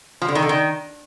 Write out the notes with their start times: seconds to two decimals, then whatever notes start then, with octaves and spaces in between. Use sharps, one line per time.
0.22 F3
0.28 D3
0.35 D#3
0.42 D3
0.49 D#3